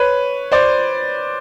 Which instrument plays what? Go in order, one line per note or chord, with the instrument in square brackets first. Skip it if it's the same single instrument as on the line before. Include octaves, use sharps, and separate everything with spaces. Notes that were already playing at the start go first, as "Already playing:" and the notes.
Already playing: [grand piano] B4 C#5
C5 D5